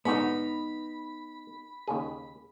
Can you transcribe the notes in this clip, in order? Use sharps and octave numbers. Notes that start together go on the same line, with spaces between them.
G#2 D3 B3 D#4 F#4 B5
D#2 C#3 G#4